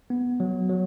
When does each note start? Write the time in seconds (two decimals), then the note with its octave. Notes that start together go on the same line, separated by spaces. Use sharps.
0.10 B3
0.40 F#3
0.69 F#3